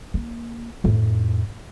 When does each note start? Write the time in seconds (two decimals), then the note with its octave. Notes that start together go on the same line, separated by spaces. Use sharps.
0.14 A#3
0.84 F2 A2